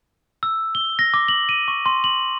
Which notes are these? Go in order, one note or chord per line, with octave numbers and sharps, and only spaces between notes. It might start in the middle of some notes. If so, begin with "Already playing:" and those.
E6
G7
A#6
D6
F#7
D#7
C#6
C6
F#7